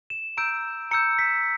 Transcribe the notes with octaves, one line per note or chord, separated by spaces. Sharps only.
E7
A#5 E6 G6 D7
A#5 E6 G6 C#7
B6